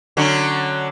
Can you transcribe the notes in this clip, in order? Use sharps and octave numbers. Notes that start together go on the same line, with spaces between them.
D3 F#3 C#4